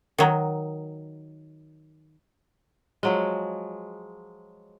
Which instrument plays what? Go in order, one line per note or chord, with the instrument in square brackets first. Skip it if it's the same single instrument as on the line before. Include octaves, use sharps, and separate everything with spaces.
[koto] D#3 F#3
[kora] F3 F#3 G#3